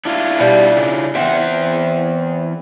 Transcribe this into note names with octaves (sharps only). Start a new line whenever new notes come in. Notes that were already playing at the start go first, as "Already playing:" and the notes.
D4 E4 F4
B2 G3
C#3
E2 C4 E5 F#5